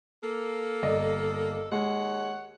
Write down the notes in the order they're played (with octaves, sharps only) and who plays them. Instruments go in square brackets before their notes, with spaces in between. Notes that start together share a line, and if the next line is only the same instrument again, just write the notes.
[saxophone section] A#3 A4
[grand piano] G1 D5 D#5
[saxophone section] D#2 C#5 F#5 [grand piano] G#3